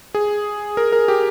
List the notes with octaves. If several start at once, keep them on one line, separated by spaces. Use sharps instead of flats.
G#4
A#4
A#4
G4